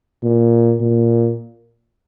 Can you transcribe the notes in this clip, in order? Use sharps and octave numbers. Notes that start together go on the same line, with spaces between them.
A#2
A#2